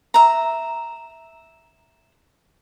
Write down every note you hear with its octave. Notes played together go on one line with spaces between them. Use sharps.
E5 A#5